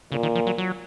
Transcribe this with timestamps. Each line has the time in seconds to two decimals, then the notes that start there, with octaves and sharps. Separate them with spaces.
0.12 A#2 C#3
0.23 D#3
0.35 F3
0.47 F#3
0.58 F#3